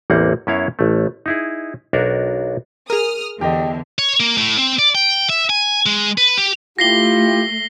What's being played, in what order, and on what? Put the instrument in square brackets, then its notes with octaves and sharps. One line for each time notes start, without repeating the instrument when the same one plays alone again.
[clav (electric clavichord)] A1 E2 G3 A#3 C4 F#5
F#2 B3 C#4 E4 C#5 F5
A1 A3
D#4 E4 G#4
B1 D4 F#4 A#4
[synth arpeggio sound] G#4 A#4 [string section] D#6 F6
[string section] E2 D3 [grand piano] G4 D#5
[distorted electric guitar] C#5
A#3
A2
C4
D5
G5
E5
G#5
G#3
B4
G4
[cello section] A3 [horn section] E4 F4 G4 [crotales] A#6 C7 G7